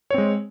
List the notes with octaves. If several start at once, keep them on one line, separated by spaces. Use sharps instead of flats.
G#3 C4 C#5